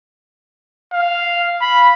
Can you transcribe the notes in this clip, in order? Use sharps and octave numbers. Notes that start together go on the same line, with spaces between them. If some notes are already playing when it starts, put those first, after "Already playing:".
F5
B5